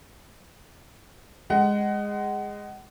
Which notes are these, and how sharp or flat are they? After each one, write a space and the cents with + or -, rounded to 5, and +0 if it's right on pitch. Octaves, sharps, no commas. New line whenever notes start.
G#3 -10 F#5 +25